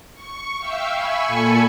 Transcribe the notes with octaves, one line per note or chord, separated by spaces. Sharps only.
C#6
E5 F5 G5 E6
G#5 B5 C#6 E6
A#2 A4 G#5 B5 C#7